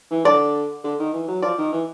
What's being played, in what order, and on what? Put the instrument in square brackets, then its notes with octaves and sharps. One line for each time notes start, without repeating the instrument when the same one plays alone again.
[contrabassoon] E3
[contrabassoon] D3 [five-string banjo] D5
[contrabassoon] D3
D#3
E3
F#3
[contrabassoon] F3 [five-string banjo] D5
[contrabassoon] D#3
E3